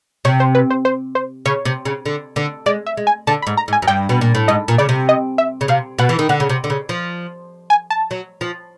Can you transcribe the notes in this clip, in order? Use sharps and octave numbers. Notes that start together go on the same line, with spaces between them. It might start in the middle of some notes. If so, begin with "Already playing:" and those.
C3 C#5
C5
B4
C5
C5
C5
C#3 C#5
C3
C#3
D3
D3
G#3 D5
E5
G#3
G#5
D3 A5
B5
G#2
A#5
G#2
G#5
F#2
G2 G5
B2
A#2
A2
G#2 D#5
A#2
C#3 D5
C3
D#5
E5
C#3
C3 F5
B2 F#5
E3
D#3
D3 F#5
C#3
C3
D3
C#3
F3
G#5
A5
F#3
F3